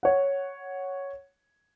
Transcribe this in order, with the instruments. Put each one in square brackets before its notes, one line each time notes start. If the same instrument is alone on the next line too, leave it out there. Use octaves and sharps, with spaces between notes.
[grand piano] C#5 F#5